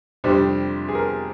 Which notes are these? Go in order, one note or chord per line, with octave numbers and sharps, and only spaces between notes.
F2 C3 G3 D4 G4
G#4
A#4